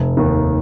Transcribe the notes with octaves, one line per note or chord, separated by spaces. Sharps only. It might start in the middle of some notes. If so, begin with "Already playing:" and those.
Already playing: F1
D#2 D#3